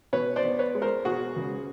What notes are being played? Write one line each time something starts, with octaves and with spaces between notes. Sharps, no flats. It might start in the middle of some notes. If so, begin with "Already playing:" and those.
B2 B4 C#5
C5 D5
B3
B4 C#5
G#3
A#4 C5
B2 F#4 G#4
C#2